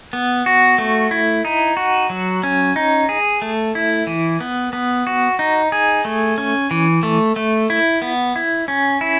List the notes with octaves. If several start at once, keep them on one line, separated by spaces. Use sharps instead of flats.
B3
F#4
A3
E4
D#4
F#4
F#3
C#4
D#4
G#4
A3
E4
E3
B3
B3
F#4
D#4
G#4
A3
C#4
E3
A3
A3
E4
B3
E4
C#4
E4